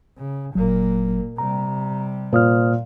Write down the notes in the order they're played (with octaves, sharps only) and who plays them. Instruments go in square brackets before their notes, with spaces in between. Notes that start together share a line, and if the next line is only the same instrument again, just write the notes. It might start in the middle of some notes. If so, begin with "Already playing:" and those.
[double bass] C#3
[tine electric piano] G1 F#3 [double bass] A#2 A#3
[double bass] C3 G3 [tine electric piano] A#5
[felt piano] A#2 [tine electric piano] C5 D#6 F6